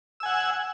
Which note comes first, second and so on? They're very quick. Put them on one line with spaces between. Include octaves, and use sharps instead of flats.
E6 G#5 F#5